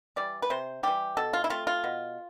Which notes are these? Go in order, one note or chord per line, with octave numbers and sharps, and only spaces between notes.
E3 G3 D5
B4
C3 C5
E3 G3 G4
B2 A4
F4
E4
A3 C4 F4
F4
B2